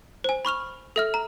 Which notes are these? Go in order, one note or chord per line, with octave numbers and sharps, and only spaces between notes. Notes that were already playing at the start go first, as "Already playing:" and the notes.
C5 G#5
B5 C#6 F6 F7
A4 E5 F6
A#5